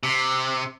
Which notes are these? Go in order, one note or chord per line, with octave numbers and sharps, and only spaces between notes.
C3